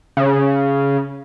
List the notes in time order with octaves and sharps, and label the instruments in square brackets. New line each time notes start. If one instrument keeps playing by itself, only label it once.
[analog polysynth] C#3